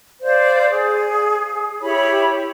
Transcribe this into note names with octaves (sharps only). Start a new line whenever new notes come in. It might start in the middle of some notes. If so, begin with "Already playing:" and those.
C5 D5 F5
G#4
E4 G4 C#5 B5